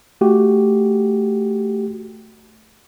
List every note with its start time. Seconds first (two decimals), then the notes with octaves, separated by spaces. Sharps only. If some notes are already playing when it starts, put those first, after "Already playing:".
0.21 A3 F#4 G4